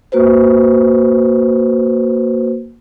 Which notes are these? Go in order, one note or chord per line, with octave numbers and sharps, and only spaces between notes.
A#3 F#4 B4 C5